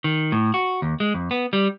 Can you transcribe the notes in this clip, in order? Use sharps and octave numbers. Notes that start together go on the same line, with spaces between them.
D#3
A2
F#4
D#2
G#3
F2
B3
G3